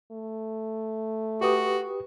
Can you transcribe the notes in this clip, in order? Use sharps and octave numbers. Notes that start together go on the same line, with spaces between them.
A3
F#4 G4 B4 D#6